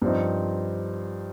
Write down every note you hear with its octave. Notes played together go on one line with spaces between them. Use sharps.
G2 F3 C4 D#4